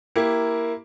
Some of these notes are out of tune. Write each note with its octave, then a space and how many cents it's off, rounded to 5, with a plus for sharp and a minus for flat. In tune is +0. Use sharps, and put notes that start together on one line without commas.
A#3 +0 E4 +0 G4 +0